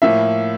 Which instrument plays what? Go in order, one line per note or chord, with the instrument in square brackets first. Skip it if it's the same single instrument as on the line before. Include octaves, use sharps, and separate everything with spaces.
[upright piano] A2 F3 A#3 [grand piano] E5